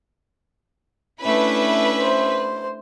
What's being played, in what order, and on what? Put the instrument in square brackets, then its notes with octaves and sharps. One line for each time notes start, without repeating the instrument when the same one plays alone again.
[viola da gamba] A3 D4 E4 [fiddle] C#4 E5 [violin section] B4
[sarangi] C5